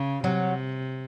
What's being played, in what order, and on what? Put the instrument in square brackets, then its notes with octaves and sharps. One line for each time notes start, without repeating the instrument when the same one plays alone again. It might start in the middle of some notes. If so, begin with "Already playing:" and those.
Already playing: [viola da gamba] C#3
[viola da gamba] C3 [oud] F#3